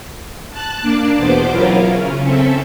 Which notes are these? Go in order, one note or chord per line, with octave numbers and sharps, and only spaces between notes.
A5 F#6
A#3 D4 D5
E2 B2 B3 C5 D6
F#3 C#4 E4 F4 A#4
C#3 C#4
C4 C#4 A4 E5